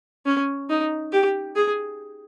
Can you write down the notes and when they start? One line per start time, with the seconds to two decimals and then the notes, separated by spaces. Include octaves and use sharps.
0.26 C#4
0.69 D#4
1.12 G4
1.56 G#4